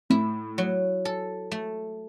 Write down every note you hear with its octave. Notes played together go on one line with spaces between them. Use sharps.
A2 E4
F#3
A4
A3